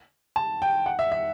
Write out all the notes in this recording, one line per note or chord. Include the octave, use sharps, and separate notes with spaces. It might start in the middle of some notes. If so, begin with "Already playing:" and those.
A5
G5
F#5
E5
E5